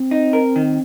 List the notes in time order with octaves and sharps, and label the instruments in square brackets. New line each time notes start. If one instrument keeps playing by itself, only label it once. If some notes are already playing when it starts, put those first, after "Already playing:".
Already playing: [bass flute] C4
[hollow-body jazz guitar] D#4
A#4
D#3